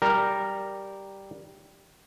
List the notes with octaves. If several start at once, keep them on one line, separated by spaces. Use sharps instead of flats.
G3 A#4